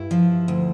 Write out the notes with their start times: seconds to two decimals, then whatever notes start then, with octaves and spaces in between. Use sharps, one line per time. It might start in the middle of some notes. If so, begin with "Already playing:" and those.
Already playing: G2 E4
0.11 F3
0.48 D2